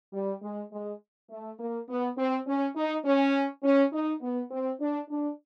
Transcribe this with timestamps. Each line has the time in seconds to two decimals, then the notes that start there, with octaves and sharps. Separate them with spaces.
0.13 G3
0.42 G#3
0.72 G#3
1.30 A3
1.59 A#3
1.88 B3
2.18 C4
2.47 C#4
2.76 D#4
3.05 C#4
3.63 C#4
3.92 D#4
4.21 B3
4.51 C4
4.80 D4
5.09 D4